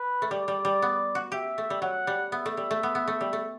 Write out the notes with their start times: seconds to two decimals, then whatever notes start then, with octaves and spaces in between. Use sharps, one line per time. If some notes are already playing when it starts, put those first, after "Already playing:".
Already playing: B4
0.22 A3
0.31 G3 D5
0.48 G3
0.65 G3
0.82 B3
1.15 F#4
1.32 G4 E5
1.58 A3
1.70 G3
1.82 F#3 F#5
2.07 G3
2.32 B3 E5
2.46 A3
2.57 G3
2.71 A3
2.83 B3
2.95 B3
3.08 A3
3.21 G3
3.33 A3